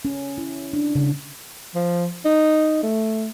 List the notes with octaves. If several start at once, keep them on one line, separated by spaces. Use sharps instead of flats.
C#4
E4
D4
C#3
F3
D#4
A3